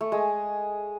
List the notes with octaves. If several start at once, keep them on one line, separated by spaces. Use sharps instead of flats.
A3
G#3